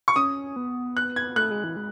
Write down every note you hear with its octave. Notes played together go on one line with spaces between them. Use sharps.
C#6
C#4 D#6
B3
F#6
G#6
A3 F#6
G#3
E3
G#3